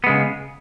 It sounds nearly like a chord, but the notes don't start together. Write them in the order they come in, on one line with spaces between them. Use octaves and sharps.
B3 G#3 C#3